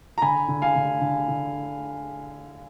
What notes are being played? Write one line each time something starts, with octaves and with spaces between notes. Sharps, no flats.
A#5
D3 G#5 B5
D3
F5 G#5
D3
D3
D3